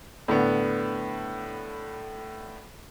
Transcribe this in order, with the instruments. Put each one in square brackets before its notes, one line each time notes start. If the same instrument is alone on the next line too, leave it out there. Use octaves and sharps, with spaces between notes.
[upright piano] A2 D3 B3